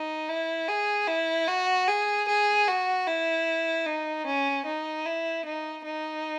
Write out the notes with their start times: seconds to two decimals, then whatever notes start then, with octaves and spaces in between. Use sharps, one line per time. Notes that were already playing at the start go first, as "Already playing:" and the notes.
Already playing: D#4
0.29 E4
0.68 G#4
1.08 E4
1.48 F#4
1.88 G#4
2.28 G#4
2.68 F#4
3.07 E4
3.87 D#4
4.26 C#4
4.66 D#4
5.06 E4
5.46 D#4
5.85 D#4